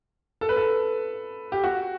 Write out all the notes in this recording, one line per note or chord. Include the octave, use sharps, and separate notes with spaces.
A4
B4
A4
G4
F#4